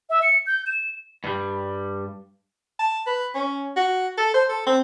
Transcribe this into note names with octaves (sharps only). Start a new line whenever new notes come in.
E5
C#7
G6
E7
G2 G3
A5
B4
C#4
F#4
A4
C5
A4
C4